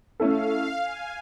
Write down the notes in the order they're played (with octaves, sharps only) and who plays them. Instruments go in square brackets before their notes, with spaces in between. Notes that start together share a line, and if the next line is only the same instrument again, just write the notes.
[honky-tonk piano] A3 C#4 E4 A4 [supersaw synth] F5
[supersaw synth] G#5